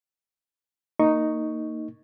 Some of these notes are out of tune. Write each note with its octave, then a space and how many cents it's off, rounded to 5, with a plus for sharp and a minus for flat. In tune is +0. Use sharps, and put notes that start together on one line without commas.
A#3 -20 D#4 +0 C#6 +0